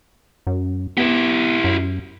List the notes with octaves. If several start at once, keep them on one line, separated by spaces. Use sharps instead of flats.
F#2
B3 E4 G4
F#2